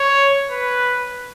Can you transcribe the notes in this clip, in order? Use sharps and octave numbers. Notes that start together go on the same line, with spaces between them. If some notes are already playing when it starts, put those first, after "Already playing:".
Already playing: C#5
B4